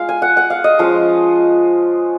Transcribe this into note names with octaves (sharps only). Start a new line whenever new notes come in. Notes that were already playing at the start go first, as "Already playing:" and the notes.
Already playing: G#3 F4 F5
G#5
F#5
F#5
F5
D#5
F3 G#3 C#4 F4 F5